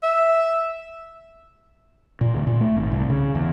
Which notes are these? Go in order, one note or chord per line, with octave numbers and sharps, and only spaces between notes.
E5
A#2
D2
A#2
A3
G#1
C2
C#3
E2